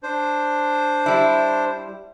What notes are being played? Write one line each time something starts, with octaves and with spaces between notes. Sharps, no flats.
D4 C5
G3 E4